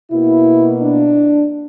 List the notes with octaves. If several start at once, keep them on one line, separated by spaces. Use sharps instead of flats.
B2 A#3 E4
D4